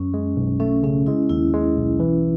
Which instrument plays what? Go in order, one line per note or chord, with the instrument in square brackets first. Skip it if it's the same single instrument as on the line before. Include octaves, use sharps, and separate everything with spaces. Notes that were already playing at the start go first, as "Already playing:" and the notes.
Already playing: [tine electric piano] F#2 [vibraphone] C#4
[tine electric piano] G#3
B1
[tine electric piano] A3 [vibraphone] C#4
[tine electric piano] C#3 [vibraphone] C#4
[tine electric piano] G#3 [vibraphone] E4
[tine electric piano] D#2 [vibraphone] E4
[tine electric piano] G#3
B1
E3